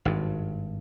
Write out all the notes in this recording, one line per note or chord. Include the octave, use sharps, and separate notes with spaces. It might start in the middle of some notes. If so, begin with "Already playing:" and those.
G#1 G2